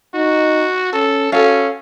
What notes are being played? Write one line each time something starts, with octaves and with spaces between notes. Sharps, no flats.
D#4 F#4
C#4 A4
C#4 F#4 A4 F5